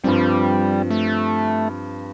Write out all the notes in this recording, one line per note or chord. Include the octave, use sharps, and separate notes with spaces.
G2 F3 G3 C4
A3